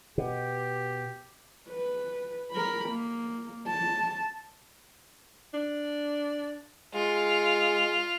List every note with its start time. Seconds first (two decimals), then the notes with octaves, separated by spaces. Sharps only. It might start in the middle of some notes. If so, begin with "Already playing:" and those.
0.18 B2 G4
1.69 B4
2.51 A#4 B5
2.89 A#3
3.67 A5
5.54 D4
6.95 G#3 F4